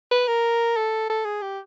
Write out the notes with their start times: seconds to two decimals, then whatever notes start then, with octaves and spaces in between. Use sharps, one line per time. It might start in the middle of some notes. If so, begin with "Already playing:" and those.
0.11 B4
0.27 A#4
0.77 A4
1.10 A4
1.25 G#4
1.42 G4